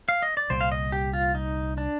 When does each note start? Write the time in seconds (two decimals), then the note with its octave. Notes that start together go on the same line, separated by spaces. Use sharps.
0.09 F5
0.22 D#5
0.37 D5
0.50 C2 A#2 G3 C5
0.61 F5
0.72 D#5
0.92 G4
1.13 F4
1.35 D#4
1.78 D4